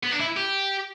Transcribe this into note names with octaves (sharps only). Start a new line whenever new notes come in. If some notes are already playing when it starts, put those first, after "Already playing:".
B3
D4
E4
G4